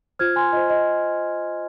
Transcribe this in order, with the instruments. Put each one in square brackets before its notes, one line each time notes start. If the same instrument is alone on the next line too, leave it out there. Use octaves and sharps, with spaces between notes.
[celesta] F4 C5 F6 G#6
G#5 C6
F4 C5 D#5
D#5